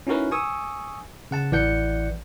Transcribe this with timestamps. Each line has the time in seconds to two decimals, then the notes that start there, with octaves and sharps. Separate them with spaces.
0.07 C#4 D#4 E4 F#4 A#4 B4
0.31 G#5 C#6 D#6 E6
1.31 C#3 F#5 A5
1.52 A1 E3 D5 F#5 G6 C#7